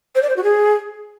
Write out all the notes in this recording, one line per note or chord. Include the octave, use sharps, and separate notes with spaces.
C5
D5
C5
F#4
G#4